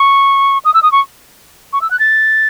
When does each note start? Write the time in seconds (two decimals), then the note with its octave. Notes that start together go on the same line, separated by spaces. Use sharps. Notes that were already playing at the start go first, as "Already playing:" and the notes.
Already playing: C#6
0.65 D#6
0.74 E6
0.83 D#6
0.92 C#6
1.73 C#6
1.82 E6
1.91 F#6
2.00 A6